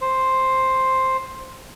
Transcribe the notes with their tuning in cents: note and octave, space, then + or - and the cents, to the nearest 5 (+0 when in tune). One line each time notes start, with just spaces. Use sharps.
C5 +5